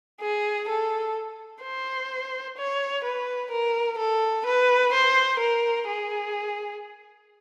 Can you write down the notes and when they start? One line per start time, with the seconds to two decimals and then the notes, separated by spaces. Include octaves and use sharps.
0.21 G#4
0.69 A4
1.62 C5
2.58 C#5
3.04 B4
3.51 A#4
3.98 A4
4.46 B4
4.93 C5
5.40 A#4
5.87 G#4